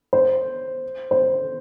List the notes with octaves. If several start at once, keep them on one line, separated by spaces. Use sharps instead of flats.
C5
C5